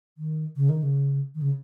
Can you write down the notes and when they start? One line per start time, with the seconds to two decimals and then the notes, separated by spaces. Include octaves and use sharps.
0.18 D#3
0.56 C#3
0.69 D#3
0.83 C#3
1.35 D#3
1.41 C#3